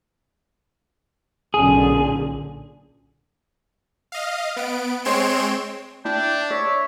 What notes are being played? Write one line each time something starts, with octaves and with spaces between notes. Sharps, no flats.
B1 A#2 D3 C#4 G#4
D#5 F5
B3 D7
G#3 C4 C#5 C6 D7 E7
D4 E4 G5
C#5 D5 E5